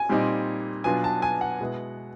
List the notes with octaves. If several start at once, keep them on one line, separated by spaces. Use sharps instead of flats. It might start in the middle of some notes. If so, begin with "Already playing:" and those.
Already playing: G#5
A#2 G3 C4 D#4
B2 F#3 B3 D4 F4 G#5
A5
G#5
F#5
B2 G#3 B3 E4